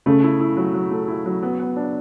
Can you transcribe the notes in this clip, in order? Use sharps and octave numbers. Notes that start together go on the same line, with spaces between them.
C#3 A3
E4
E4
F#3
F#3
A3
E4
F#3
B3
B3
D4